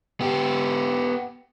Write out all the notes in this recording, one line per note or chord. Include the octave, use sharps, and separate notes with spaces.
B3 G4